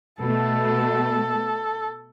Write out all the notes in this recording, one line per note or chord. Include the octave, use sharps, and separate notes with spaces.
B2 A3 A4